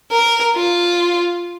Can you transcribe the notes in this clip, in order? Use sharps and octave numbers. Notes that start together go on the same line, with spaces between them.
A#4
F4